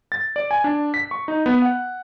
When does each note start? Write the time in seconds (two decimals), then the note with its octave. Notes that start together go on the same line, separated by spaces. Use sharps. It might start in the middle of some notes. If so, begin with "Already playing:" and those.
0.12 A6
0.36 D5
0.51 G#5
0.64 D4
0.94 B6
1.11 C#6
1.28 D#4
1.46 B3
1.62 F#5